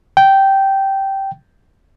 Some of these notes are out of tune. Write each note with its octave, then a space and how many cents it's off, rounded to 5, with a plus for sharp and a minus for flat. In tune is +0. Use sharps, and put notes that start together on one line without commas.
G5 -10